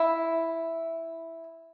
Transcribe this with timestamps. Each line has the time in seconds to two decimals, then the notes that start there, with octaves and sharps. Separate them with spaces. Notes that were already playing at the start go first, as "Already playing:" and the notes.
Already playing: E4